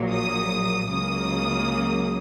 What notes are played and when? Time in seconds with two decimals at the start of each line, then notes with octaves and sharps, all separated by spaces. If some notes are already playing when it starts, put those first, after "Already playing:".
Already playing: A#1 A#2 F#3
0.11 D#6
0.90 C#2 C#3 F#3 A#3 D#6